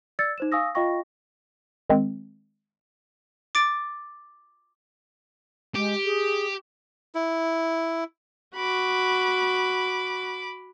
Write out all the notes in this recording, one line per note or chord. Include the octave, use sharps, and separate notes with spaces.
D5 E6 G#6 A6 C#7
D#4 C5 E7
F5 G#5 C#6 D#6 E6 A#6
F4 D#5 F5 G5 C#6 A#6
D#3 G#3 C4
D6 A6 D7
G#3 G4
G#4
E4
F#4 B5 D6